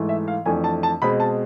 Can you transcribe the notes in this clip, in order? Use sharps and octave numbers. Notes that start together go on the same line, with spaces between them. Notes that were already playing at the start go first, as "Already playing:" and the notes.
Already playing: G#2 E3 A3
E5
F5
F2 E3 A3 D4 G#5
A5
A5
B2 G#3 C4 B5
A5